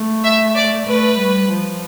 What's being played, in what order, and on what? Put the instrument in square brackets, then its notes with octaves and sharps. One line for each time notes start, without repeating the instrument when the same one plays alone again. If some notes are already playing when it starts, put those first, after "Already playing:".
Already playing: [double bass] A3
[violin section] E5
D5
[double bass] A3 [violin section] B4
[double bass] G3
F3